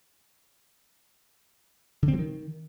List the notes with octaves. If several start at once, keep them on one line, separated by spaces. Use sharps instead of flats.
D3
C4
F#3
D#3